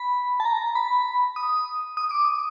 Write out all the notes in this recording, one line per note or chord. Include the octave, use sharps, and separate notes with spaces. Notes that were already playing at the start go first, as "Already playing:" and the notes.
Already playing: B5
A5
A#5
B5
D#6
D#6
D6
D#6